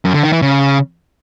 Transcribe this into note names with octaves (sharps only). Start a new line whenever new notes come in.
F#2
D3
D#3
E3
C#3